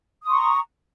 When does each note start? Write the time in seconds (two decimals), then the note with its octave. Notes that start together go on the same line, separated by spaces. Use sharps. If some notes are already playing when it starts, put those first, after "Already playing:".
0.23 D#6
0.27 C6
0.30 C#6
0.34 A#5